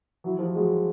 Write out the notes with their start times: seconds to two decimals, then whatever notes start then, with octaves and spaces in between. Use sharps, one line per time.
0.24 E3 F#3
0.39 F3 G3
0.55 F#3 G#3